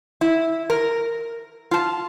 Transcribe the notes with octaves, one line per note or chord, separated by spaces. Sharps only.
E4
A#4
F4 A5